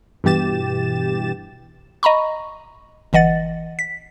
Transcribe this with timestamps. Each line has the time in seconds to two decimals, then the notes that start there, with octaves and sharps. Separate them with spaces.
0.24 G2 B2 E3 G4 A6 E7
2.03 D#5 A#5 B5 C#6
3.13 G1 E3 D#5 F#5 A6
3.79 B6